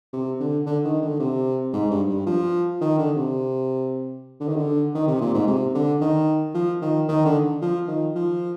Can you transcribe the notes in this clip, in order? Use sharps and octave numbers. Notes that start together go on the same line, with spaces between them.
C3
D3
D3
D#3
D3
C3
G#2
G2
G2
F3
D#3
D3
C3
D3
D#3
D3
D#3
C3
A#2
G#2
C3
D3
D#3
F3
D#3
D#3
D3
F3
D#3
F3